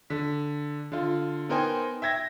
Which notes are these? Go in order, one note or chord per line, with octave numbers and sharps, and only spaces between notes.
D3 B6
D3 F4
B3 D#4 A#4 C5 G5 G#5
E5 G5 G#6 A#6